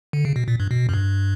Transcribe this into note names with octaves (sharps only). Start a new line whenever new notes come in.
D3
C#3
B2
A#2
G2
B2
F#2
G2